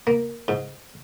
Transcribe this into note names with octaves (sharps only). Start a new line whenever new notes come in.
A#3
G#2